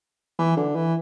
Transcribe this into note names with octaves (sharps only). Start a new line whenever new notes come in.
E3
D3
E3